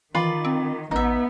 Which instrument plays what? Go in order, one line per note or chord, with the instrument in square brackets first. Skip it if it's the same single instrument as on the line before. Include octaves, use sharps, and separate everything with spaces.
[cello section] D#3 [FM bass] E3 [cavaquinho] F4 D5 B5
[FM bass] C4
[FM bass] A1 [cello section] B3 [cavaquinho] D#4 E5